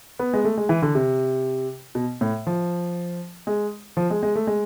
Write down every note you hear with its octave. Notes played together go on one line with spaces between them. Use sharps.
B3
G#3
A3
G#3
E3
D3
C3
B2
A2
F3
G#3
F3
G#3
G#3
A3
G#3